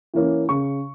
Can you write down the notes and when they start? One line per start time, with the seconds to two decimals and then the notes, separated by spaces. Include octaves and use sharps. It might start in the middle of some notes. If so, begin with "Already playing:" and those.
0.14 E3 A#3 C#4
0.48 C#3 C#6